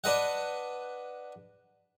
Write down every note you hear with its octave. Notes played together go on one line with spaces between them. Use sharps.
D4 B4 D#5 F#5